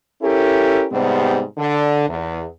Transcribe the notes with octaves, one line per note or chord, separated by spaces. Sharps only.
C#4 E4 G4 A4 A#4
G#2 C3 G3 B3 C4
D3
E2